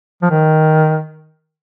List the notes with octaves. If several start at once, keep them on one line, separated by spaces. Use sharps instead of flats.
F3
D#3